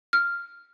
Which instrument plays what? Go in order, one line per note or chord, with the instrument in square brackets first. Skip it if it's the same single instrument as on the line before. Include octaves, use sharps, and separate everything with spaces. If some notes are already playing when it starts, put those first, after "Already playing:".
[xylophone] F6